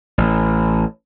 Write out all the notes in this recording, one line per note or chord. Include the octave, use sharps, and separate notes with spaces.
A1